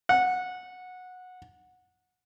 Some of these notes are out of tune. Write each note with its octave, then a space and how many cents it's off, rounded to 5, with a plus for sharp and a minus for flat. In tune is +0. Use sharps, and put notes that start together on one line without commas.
F#5 -15